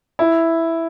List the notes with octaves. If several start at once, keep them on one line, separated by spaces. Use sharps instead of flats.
E4